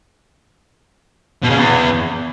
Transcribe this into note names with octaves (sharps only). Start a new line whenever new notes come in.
B2
C#3
E2